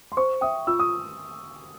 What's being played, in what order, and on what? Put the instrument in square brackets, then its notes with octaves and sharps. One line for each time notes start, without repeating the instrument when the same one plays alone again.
[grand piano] C6
[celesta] C5 [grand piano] C#6
[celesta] E5 G5 [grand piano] D#6
[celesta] F4 [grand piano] E6
[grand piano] D#6